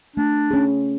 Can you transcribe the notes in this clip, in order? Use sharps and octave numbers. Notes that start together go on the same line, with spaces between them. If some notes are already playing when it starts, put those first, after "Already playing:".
A3 D4
C#4 G#4